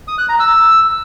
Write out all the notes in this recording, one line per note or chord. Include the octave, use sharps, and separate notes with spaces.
D#6
F#6
A#5
E6